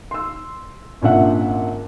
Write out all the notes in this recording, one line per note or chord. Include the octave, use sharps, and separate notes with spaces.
C6 E6
G#1 A#2 C#3 D4 E5 F#5